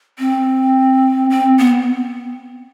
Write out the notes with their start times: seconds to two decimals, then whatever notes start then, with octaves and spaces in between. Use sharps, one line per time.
0.19 C4
1.30 C4
1.59 B3